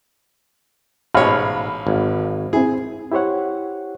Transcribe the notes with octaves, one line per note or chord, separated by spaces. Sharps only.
A1 G#2 B2 C#5 F5 B5 F6
G#1
C4 E4 G#4
E4 G4 C5 C#5 F#5